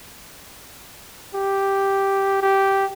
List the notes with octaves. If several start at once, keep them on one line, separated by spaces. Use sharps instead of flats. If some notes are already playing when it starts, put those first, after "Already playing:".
G4
G4